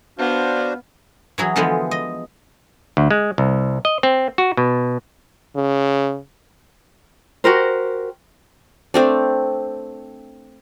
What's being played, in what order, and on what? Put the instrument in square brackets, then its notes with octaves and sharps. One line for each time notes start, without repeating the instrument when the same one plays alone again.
[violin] B3 [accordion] D4 F#4 C5 [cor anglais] F5
[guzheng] E3 F#3 G#4
D3 E3 F3 G#3 B3
D#5
[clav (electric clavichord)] D2
G#3
C2
D#5
C4
F#4
B2
[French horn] C#3
[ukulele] F#4 G4 A#4 C5
[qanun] A3 C4 D4